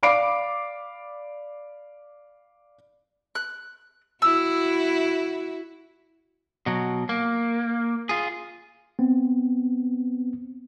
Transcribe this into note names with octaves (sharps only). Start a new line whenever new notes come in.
D5 F5 B5 D6 C7 D7
F#6
E4 F#4 E6
B2 F#3
A#3
F4 G#4
B3 C4